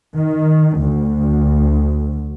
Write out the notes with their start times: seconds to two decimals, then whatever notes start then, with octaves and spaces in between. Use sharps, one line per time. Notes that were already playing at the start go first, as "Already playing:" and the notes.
0.17 D#3
0.80 D2